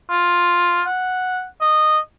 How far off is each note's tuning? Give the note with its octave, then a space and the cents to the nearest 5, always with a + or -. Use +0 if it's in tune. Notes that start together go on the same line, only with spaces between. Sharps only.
F4 +5
F#5 -5
D#5 -15